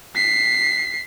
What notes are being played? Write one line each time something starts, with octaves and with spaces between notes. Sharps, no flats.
B6 C7